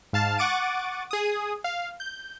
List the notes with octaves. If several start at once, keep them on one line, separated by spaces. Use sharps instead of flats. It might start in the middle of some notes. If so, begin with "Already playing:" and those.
G#2 F5 A5 F6
F#5 C#6 D6 A6 D7 D#7
G#4 D#6
F5
G6